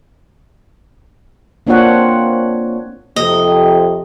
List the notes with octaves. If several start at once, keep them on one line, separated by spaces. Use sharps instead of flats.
A#3 C4 D4 F4 C#5 F#5
F2 C3 D#5